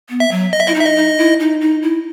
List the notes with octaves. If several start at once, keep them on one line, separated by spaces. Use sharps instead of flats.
B3
E5
F#3
D#5
E5
E4 D#5
D#4
E5
D#5
D#4
E4
D#4
D#4
E4